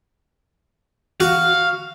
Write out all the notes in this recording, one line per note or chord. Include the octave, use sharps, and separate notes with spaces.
F#4 F5